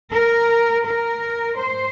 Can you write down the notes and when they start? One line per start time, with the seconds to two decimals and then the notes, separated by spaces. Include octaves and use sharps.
0.12 A#4
0.85 A#4
1.59 C5